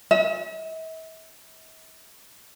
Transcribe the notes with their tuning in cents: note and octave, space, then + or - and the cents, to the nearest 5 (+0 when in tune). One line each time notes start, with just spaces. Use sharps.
E5 -45